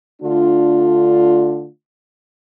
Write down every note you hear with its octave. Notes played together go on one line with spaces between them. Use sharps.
D3 A3 D4 F4